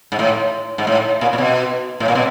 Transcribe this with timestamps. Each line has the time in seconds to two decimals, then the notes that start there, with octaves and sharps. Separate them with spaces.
0.12 G#2
0.19 A2
0.78 G#2
0.87 A2
1.21 A#2
1.33 A#2
1.38 B2
2.00 A2
2.08 A#2
2.15 B2